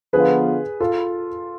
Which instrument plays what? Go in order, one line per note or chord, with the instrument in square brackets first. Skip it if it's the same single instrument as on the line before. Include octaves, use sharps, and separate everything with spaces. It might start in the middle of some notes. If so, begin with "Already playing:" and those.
[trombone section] D3 F3 B3 F4 [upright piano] G#4 B4
[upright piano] F4 A4